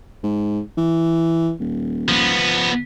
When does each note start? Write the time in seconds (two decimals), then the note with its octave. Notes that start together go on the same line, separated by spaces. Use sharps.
0.23 G#2
0.77 E3
1.60 D#1
2.09 F3 B3